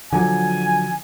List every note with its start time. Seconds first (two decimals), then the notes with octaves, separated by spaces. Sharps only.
0.13 D3 F3 F#3 G#5